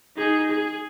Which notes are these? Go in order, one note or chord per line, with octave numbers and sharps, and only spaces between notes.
D#4 G#4
G#4